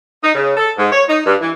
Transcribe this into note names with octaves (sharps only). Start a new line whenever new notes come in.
D#4
C#3
A4
G#2
C#5
D#4
G2
E3